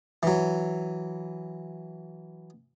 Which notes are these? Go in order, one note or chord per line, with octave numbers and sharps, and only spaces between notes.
E3 F#3